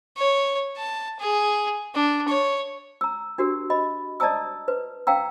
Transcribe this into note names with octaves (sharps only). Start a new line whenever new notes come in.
C#5
A5
G#4
D4
C#5
A#5 E6
D4 F#4 G4 A#4
D#5 B5
D5 D#5 A5 A#5 D#6 E6
B4
F5 G5 A#5 E6